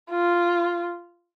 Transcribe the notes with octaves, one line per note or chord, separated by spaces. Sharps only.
F4